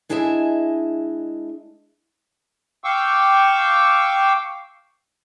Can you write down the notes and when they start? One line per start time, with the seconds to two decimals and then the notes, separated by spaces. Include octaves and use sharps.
0.09 G#3 D4 E4 G#4 D#5 E5
2.84 F5 G5 C#6 D6 E6